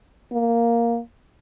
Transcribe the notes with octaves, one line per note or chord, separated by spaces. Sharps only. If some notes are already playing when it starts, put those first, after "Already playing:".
A#3